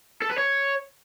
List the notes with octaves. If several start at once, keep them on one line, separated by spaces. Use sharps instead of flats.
A4
B4
C#5